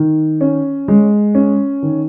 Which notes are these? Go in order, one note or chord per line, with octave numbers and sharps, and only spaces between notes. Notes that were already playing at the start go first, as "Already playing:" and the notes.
Already playing: D#3
C#4
G#3
C#4
D#3